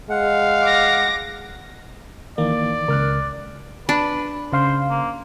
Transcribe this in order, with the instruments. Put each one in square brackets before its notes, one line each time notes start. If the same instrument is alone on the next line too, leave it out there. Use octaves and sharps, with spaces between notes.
[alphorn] G#3 [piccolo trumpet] F5 [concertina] F#5
[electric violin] D6 A#6
[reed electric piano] D#3 E3 [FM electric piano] A#3 [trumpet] D5
[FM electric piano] C#2 [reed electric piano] A#4 F6 F#6
[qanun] D4 [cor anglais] B4
[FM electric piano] C#3 F5 C6 [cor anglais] C5
[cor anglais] A#3